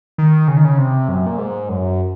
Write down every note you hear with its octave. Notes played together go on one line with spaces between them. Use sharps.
D#3
C#3
D#3
C#3
C3
F#2
A#2
G#2
F#2